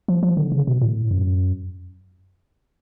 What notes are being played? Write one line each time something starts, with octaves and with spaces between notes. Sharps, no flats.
F3
F3
D3
C#3
B2
A2
F#2